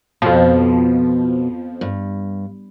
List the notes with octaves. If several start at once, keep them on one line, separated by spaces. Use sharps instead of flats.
F2 B2 F3
G2